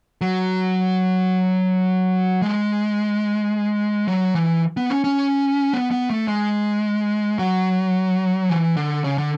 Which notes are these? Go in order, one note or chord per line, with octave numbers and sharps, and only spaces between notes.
F#3
G#3
F#3
E3
B3
C#4
C#4
B3
B3
A3
G#3
F#3
E3
D3
C#3
D3